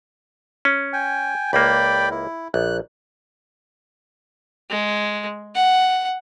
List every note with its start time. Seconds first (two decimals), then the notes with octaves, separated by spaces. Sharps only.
0.65 C#4
0.93 G5 G#5
1.53 C#2 A#3 D5 G5 B5
2.11 E4
2.54 A#1 F#6
4.71 G#3
5.55 F#5